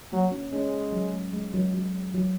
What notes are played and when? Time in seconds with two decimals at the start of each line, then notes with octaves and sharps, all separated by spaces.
0.12 F#3 A#3
0.32 C#4
0.52 G#3 C#4
0.92 F#3
1.13 G#3
1.33 G#3
1.54 F#3
1.73 F#3
2.14 F#3